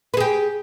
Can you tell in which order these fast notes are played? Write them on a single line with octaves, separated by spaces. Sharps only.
B4 G#4 G4